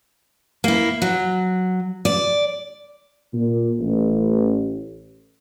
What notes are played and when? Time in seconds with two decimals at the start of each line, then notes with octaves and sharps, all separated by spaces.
0.64 A#3 E4
1.02 F#3
2.05 D5
3.34 A#2
3.79 A1